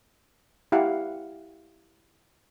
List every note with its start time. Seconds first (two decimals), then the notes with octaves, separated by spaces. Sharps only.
0.72 E4 G4 F5 F#5